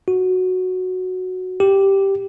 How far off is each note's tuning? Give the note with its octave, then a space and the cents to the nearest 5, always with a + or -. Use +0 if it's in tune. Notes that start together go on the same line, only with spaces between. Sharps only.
F#4 -5
G4 -5